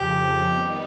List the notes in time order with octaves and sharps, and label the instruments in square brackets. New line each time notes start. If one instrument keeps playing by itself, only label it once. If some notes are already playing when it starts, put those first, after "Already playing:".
Already playing: [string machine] F2 C#3 F3 [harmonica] G4
[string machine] D#3 G3 B3 D#4